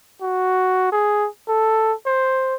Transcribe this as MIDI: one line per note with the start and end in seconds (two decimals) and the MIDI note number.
0.22 0.87 66
0.92 1.28 68
1.49 1.93 69
2.06 2.55 72